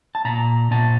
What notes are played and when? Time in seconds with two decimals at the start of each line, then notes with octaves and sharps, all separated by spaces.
0.15 A5
0.25 A#2 A#5
0.71 A#2 A5